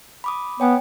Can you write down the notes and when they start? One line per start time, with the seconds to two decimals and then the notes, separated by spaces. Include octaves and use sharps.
0.24 B5 D6 D#6
0.60 B3 C#5 G5 G#5